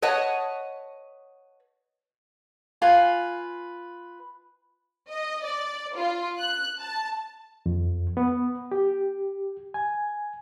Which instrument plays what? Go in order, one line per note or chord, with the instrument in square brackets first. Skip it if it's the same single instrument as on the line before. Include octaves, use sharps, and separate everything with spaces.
[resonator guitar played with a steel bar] B4 C#5 D#5 F#5 A5
[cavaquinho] F4 B4 G#5
[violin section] D#5
D5
F4
F#6
A5
[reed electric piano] F2
B3
G4
G#5